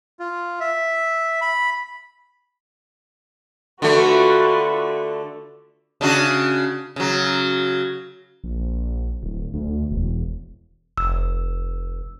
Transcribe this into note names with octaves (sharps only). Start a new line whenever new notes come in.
F4
E5
B5
D3 A3 F4 F#4 B4
C#3 D4 F#4
C#3 F#3
A#1
D1
D2
E1
F1 E6